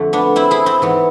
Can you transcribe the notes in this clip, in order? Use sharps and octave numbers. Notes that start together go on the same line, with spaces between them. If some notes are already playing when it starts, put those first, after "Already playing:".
Already playing: F2 D3 A3
B3 D4
C4 E4
E4 G#4
C4 E4
G#2 E3 B3